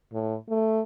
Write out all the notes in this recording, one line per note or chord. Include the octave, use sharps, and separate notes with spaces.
A2
A3